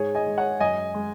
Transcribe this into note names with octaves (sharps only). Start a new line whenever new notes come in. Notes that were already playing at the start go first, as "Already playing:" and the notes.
Already playing: G#2 G#4 C#5
D#5 G#5
G#3
C#5 F#5
F#2 D#5 G#5
G#3